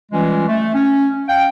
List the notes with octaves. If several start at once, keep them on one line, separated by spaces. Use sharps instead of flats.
E3 G3 G#3 C#4 F4
A3
C#4
F5 G5